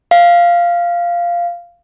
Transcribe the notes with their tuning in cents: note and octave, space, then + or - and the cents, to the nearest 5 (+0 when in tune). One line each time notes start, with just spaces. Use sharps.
F5 -5